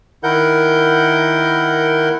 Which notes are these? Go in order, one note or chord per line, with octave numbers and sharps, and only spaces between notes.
D#3 E4 A#4 F#5 G6